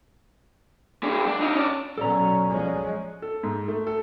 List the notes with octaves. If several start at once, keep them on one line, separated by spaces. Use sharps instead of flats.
G#3 D4
D4
D#4 F4
C#4 D5
B2 F#3 C#4 A4 D5 A#5
F3 G#3 C#4
A4
G#2
A3
A4